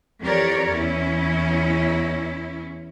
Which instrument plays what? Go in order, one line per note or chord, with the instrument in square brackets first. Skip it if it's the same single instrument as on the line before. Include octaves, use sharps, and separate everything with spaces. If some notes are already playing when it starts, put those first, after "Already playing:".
[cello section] F2 E3 G4 A#4 C#5 D5
E2 C#4 E4